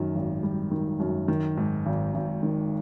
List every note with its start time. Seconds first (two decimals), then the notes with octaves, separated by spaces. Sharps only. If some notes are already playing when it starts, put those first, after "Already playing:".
Already playing: F#2 D#3
0.15 G#1
0.43 G3
0.71 D#3
1.00 F#2
1.28 D#3
1.57 G#2
1.86 G#1
2.14 G#1
2.43 D#3